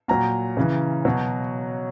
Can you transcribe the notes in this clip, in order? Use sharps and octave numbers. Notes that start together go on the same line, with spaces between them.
A#2 F#3 A#5
C#3 E3
B2 F#3